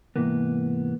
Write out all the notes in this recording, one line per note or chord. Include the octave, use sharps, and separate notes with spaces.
G#2 C3 E3 A#3 B3